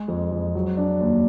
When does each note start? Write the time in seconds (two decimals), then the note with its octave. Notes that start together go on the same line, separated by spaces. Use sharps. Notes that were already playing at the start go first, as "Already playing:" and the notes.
Already playing: G#3
0.08 F2
0.32 F2
0.55 F#3
0.77 D4
1.00 D#2